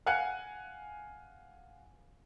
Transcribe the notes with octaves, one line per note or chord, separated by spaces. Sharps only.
F5 F#5 G#5 F#6 C#7